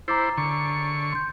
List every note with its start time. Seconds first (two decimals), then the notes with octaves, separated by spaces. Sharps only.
0.08 E4 C5 A#5 D6 A6
0.38 D3 C#6
1.12 C6 G6